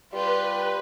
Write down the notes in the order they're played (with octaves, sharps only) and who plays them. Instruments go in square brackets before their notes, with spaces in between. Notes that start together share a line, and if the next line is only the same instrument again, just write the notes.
[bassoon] G3 [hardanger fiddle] F4 G4 [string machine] B4